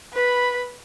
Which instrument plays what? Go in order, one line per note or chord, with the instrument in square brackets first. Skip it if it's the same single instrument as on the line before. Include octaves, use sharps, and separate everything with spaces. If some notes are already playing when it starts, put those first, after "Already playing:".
[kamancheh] B4 B5